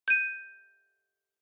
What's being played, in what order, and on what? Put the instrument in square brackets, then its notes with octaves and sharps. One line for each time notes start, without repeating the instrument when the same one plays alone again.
[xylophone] G6 D#7